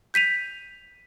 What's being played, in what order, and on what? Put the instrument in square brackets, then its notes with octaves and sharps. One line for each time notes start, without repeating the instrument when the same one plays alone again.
[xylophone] G6 B6 D#7 F7